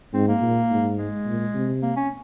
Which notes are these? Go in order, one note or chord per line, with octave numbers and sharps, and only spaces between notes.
G#2 C4
A#3
A#2
G#2
G#3
A#2
C3
A#3
C#4